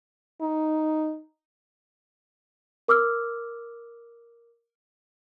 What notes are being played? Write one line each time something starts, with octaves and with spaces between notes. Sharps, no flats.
D#4
A#4 D6 E6 F6